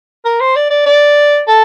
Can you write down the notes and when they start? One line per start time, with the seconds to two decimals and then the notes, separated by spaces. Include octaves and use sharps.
0.25 A#4
0.40 C5
0.56 D5
0.70 D5
0.86 D5
1.47 A4